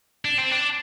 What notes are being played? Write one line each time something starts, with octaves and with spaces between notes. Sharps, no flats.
D4
C4
D4